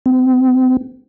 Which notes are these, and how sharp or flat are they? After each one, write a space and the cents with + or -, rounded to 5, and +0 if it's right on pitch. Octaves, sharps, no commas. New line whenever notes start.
C4 -35